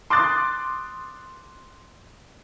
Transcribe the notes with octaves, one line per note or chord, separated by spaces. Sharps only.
C6 D6 D#6 F#6 A6